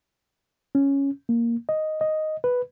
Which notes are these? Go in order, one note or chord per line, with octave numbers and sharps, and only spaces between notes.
C#4
A#3
D#5
D#5
B4